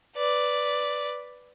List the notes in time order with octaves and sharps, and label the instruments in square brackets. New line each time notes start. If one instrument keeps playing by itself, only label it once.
[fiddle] B4 D5